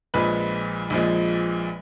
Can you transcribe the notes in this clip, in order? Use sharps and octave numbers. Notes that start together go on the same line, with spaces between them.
A#1 A#2 F3 G#3 B4 B5
A#1 A#2 F3 G#3